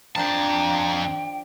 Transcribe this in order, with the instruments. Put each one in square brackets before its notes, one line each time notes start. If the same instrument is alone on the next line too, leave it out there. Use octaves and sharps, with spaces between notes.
[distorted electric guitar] F2 A5 [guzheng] F3 D4 C5 [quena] G5 [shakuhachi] A#5